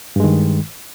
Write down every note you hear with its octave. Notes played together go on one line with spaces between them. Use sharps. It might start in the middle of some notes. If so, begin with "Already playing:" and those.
G2 D#3 G#3